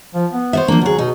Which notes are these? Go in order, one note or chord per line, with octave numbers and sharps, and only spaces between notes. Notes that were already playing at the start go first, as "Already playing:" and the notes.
F3
B3
C5 C#5 E5
F3 A#3 D4
D2 F#3 G#4
B2 D#4